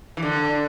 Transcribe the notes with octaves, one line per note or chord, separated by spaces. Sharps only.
E3
D3